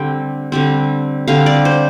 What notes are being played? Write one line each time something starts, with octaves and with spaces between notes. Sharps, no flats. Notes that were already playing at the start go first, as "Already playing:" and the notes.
Already playing: D3 G3 C4 G5
D3 G3 C4
D3 G3 C4 F5
D5
C5